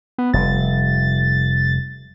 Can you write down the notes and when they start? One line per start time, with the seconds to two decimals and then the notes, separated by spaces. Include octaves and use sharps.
0.18 B3
0.34 F1 G3 A6